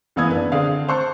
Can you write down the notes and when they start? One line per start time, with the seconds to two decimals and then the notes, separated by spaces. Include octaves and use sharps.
0.16 F#1 E3 B3 F5 D#6 G#6
0.31 D4 B4
0.52 D3 C4 G#4 F5
0.88 C5 A5 C#6 F#6